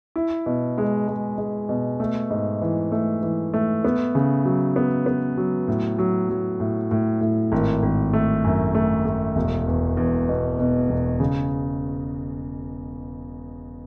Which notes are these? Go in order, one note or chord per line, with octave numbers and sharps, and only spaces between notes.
E4
B2
G#3
G#3
G#3
B2
A3
G#2
E3
A3
E3
A3
B3
C#3
F#3
B3
B3
F#3
A2
F#3
F#3
A2
A2
A2
G#1
G#1
A3
F#2
A3
A3
E1
E2
E2
B2
B2
E1
C#3